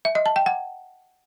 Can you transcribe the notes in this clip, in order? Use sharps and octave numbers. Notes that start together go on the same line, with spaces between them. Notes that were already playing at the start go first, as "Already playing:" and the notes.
E5
D#5
A5
G5
F#5